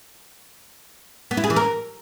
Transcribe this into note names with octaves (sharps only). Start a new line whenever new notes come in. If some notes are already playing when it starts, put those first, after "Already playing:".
B3
E4
G#4
E3
A#4